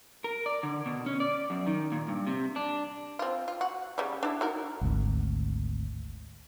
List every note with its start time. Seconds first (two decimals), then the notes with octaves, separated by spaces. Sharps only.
0.24 A#4
0.46 D5
0.63 D3
0.86 B2
1.06 C#4
1.20 D5
1.50 F#2
1.67 D#3
1.92 A#2
2.08 G2
2.27 C3
2.56 D4
3.19 C4 F4
3.48 F4
3.61 F#4
3.98 C#3 G3
4.23 D4 E4
4.41 D#4 F#4 A#4
4.81 G#1 D2